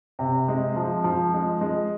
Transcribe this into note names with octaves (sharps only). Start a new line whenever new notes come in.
C3
G#3
F3
F3
G#3
G#3